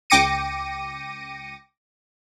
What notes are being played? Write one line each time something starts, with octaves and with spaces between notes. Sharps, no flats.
C#2 G5 D6 A#6 C#7 D#7